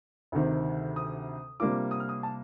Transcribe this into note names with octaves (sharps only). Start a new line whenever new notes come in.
D2 C3 D#3
D#6
C3 G3 A#3 D4 F4 D6
D#6
F6
D#6
A5